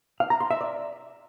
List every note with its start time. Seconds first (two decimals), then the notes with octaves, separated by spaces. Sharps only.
0.20 F5
0.30 A#5
0.40 C6
0.51 E5
0.61 D5